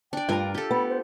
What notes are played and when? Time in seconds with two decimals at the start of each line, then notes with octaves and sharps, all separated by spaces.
0.13 D4 D5 G5
0.29 G2 F4 A#4 A#5
0.55 G4 A4
0.71 B3 B5
0.89 C5